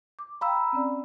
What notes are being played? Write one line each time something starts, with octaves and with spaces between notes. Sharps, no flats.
D6
F5 G5 A#5 B5 E6
C4 C#4 D5